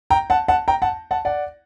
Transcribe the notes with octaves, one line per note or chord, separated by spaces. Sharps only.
G5 A#5
F#5 A5
F#5 A5
G5 A#5
F#5 A5
F#5 A5
D5 F#5